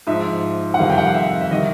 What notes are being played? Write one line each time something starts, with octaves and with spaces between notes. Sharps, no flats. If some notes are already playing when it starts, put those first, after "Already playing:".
G#2 F3 E5
F#5
F2 C3 D#3 G3 F5
G5
F#5
F5
E5
E5
D#3 G3 D#5